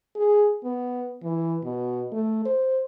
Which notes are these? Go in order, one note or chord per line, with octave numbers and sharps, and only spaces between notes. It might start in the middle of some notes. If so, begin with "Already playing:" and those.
G#4
B3
E3
B2
A3
C5